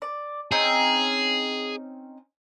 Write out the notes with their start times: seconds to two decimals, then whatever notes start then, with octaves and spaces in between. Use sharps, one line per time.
0.02 D5
0.52 C4 C#4 D#4 G#4